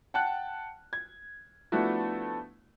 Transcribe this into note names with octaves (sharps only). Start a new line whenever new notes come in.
F#5 G5 A5 F#6
G#6
F3 A3 B3 D4 E4 F#4